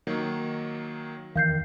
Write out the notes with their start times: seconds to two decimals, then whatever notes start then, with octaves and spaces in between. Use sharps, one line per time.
0.07 D#3 F#3 A#3
1.36 E2 D#3 E3 F5 G6 C7